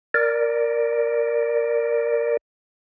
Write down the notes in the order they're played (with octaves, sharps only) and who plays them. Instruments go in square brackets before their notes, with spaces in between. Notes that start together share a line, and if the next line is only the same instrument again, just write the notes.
[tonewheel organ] A#4 D5